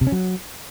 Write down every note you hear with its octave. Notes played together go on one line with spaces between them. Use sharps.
C3
C#4
F#3